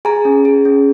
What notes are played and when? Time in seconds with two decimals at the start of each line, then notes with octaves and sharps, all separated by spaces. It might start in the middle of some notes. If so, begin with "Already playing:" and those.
0.05 G#4 G#5 A#5
0.25 C#4
0.45 G#4
0.65 C#4